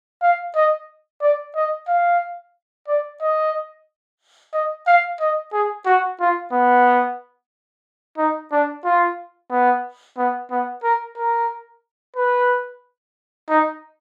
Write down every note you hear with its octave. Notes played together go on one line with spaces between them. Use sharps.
F5
D#5
D5
D#5
F5
D5
D#5
D#5
F5
D#5
G#4
F#4
F4
B3
D#4
D4
F4
B3
B3
B3
A#4
A#4
B4
D#4